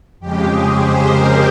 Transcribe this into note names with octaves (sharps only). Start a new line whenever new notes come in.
F2 C#3 G#3 G4
G#4
C5
A#4